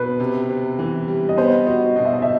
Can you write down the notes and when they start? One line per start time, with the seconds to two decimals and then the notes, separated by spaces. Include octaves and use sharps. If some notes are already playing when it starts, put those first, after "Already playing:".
Already playing: B2 B4
0.20 C3
0.49 C3
0.79 E3
1.08 G3
1.29 D#5
1.38 B3 C5
1.66 F#4 D#5
1.96 B2 D#5
2.05 E5
2.13 D#5
2.22 E5